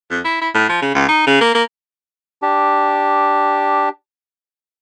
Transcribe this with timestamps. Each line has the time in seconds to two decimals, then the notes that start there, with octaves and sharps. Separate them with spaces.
0.10 F2
0.25 E4
0.41 E4
0.54 A2
0.69 F3
0.82 C#3
0.95 C#2
1.09 D#4
1.27 C#3
1.41 A#3
1.55 A#3
2.42 D4 G4